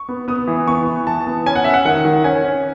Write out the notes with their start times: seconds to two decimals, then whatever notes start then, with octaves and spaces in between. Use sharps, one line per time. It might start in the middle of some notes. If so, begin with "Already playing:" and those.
Already playing: C#6
0.09 B3
0.28 B3 D#6
0.47 E3
0.68 B3 C#6
0.87 E3
1.07 E3 A5
1.27 B3
1.46 C#4 G#5
1.55 F#5
1.64 C#4 E5
1.74 F#5
1.85 D#3 F#5
2.05 D#3
2.24 C#4 G#5
2.45 C#4